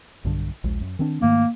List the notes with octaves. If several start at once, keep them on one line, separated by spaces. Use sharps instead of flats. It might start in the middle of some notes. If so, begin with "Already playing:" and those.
B1 G2 D3
A#1 D#2 G#3
F#2
D#3 C4 D4
G#2 D#3 A3 A#3